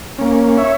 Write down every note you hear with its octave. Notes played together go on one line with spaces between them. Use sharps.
A#3 C#4
C#5 E5